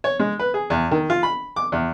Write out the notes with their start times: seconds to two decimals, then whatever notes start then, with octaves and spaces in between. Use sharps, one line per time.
0.04 C#5
0.20 G#3
0.39 B4
0.54 G#4
0.70 E2
0.91 D#3
1.10 F4
1.23 B5
1.56 D6
1.72 E2